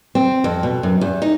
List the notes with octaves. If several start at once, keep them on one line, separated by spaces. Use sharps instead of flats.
C4
F2
B2
F#2
E2
D#4